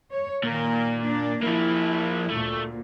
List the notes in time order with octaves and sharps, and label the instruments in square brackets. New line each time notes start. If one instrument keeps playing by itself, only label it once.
[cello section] C#5
[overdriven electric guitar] A#2 [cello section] D#3 A#3 A#4
[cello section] A#3 D4
[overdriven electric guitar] F3 A#3 [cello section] E4
[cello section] D2 A#2 [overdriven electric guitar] A3